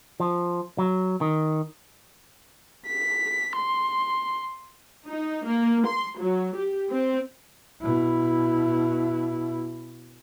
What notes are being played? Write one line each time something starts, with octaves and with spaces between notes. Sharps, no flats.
F3
F#3
D#3
B6
C6
D#4
A#3
C6
F#3
G4
C4
B2 E4